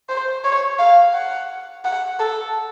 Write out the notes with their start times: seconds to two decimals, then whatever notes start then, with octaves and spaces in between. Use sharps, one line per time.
0.09 C5
0.44 C#5
0.79 F5
1.14 F#5
1.85 F#5
2.19 A4